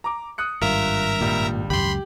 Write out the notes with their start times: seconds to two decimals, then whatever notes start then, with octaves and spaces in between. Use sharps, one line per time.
0.04 A#5 D6
0.38 D#6 F#6 C#7
0.62 G#1 G2 F4 A#4 E5 A#5
1.21 C#2 A#2 G3
1.70 C#2 F#2 G4 B5 C6 F#7